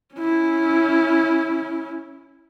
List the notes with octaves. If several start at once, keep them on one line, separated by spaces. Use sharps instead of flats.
C#4 E4